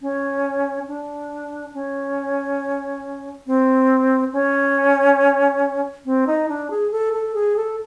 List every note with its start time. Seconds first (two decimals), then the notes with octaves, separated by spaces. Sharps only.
0.02 C#4
0.88 D4
1.74 C#4
3.47 C4
4.33 C#4
6.05 C4
6.27 D#4
6.49 D4
6.70 G#4
6.92 A4
7.13 A4
7.35 G#4
7.57 A4